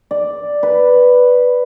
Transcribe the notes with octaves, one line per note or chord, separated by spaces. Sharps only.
D5
B4